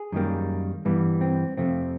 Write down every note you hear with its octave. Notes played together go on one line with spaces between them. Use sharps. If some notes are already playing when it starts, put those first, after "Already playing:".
Already playing: G#4
F#2 D#3 G3 A#3
G2 E3 G3 B3
C4
F2 C3 F3 A3 C4